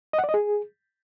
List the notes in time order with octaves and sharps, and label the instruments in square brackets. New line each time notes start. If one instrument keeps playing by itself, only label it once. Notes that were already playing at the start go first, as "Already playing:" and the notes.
[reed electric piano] D#5
F#5
D5
D#5
G#4